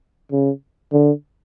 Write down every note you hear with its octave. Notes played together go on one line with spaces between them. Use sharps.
C#3
D3